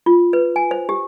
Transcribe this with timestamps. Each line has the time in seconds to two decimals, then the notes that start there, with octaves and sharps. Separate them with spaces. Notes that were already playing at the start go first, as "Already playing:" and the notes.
0.06 F4
0.33 B4
0.56 G#5
0.71 C5
0.89 G4